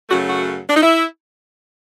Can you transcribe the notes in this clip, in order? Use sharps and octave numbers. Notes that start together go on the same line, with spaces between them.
F#2 C#3 F#3 A3 F#4
F#4
D4
D#4
E4